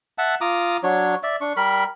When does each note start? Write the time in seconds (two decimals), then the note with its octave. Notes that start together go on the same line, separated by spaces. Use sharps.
0.18 E5 F#5 A5
0.41 F4 A#5 D6 D#6
0.83 F#3 D4 C#5
1.23 D5 E5
1.41 D4 C#6
1.57 G3 A#4 B5